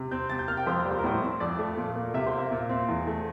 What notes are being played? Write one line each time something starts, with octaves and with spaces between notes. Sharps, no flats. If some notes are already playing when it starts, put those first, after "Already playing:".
Already playing: C3
C4 G6
C3 A6
G6
A#3 F6
G5
F2 C5
A#4
G3
C5
A#4
A2 C5
C4
F2 D5
A3
A#2
A#3
C3 E5
C5
A#3
E5
A#2
C4
E2
A3